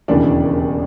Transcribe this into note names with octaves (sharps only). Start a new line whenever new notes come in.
E1 D#2 C#3 E3 D4 D5